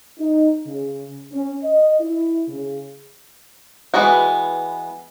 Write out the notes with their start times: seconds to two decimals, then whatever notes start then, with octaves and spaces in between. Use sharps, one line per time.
0.19 D#4
0.66 C#3
1.32 C#4
1.64 D#5
2.01 E4
2.48 C#3
3.94 E3 G#3 B3 F#4